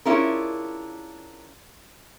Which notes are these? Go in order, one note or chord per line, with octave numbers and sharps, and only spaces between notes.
C#4 D4 E4 F4 G#4 A#4